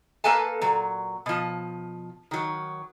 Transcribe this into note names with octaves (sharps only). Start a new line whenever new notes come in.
A#3 A4 B4 F5 G#5 A5
A#2 F#3
B2 F3
D#3 F#3